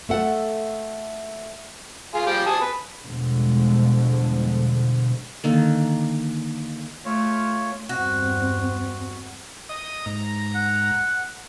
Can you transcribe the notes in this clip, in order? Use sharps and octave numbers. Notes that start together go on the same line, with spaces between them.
A3 A4 F#5
F4 G#4
F3 G3 G4
G#5 A5 D#6
B4
E2 B2 D3 F3 G3 G#3
D3 D#3 A#3
A3 F4 C#5
E2 G2 C4 F#4
D#5 D#6
G#2 A#5
F#5